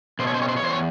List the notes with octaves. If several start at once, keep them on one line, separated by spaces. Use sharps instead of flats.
B2 C5
C#5
C5
C#5
C5
C#5
E2 C5
C#5